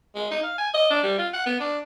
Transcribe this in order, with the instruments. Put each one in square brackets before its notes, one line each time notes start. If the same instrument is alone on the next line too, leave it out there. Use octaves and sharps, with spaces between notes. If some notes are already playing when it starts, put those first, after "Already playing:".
[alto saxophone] G#3
D#4
F5
G#5
D#5
D4
G3
F4
F#5
B3
D4